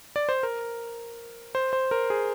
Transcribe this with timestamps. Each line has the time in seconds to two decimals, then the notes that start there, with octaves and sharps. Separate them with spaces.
0.16 D5
0.29 C5
0.43 A#4
1.55 C5
1.73 C5
1.91 A#4
2.10 G#4